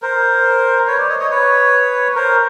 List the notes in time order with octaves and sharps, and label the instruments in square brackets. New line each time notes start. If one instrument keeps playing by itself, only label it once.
[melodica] A#4 C5
B4 C#5
C5 D5
C#5 D#5
C#5 D#5
B4 C#5
A#4 C5